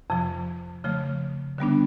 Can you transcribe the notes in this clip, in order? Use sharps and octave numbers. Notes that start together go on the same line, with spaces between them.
F2 C3 F3
C#3 F3 A3
D3 G3 B3 D4